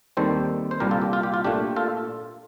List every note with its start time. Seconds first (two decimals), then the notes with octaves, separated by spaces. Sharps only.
0.17 D#2 D#3 G3 C4 A4 C5
0.71 C5
0.80 C2 A#2 G3 G4 A#4
0.91 F4 A4
1.02 G4
1.13 F4
1.23 G4
1.34 F4
1.44 A#2 A3 D4 G4
1.76 F4 A4